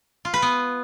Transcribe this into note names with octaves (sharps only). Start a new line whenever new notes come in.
F4
B4
B3